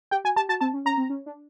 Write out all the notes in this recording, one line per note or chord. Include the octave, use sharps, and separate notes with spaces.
G4 G5
F#4 G#5
G4 A5
F#4 A5
C4 A5
C#4
C#4 A#5
C4
C#4
D4